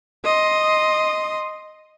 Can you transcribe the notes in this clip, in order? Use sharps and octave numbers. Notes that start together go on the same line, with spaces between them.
D#5 C6